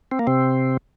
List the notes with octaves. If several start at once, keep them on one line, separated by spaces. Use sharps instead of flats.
C4
A#3
C3 C4